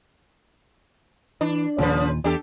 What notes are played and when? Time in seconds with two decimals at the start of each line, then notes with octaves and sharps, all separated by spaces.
1.41 E3 D4
1.78 D#2 A#2 C#3 F3 B4
2.24 E2 D4 G4 A4